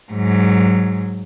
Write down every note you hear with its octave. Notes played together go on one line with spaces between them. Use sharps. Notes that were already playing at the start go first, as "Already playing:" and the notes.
G#2 F#3